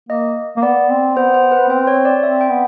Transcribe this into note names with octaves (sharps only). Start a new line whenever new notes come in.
A#3 D#5
A#3
B3 D5
C4
B3 C5
C5
B4
C4 C5
C#5
D5
C4 E5
G5
B3